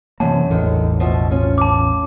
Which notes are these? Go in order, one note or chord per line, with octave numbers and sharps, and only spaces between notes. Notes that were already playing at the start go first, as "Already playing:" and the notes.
F#2 C3 E3 A#3 A5
A1 E2 D3 D#3
B2 F3 E5
C#4 F4
A5 D6